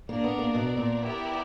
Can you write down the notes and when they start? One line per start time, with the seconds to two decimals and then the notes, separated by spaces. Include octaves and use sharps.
0.08 A#3 D4 A#4 D5
0.24 B3
0.39 A#3
0.55 B2
0.77 A#2
1.00 B3 E4 G4 A#4 D5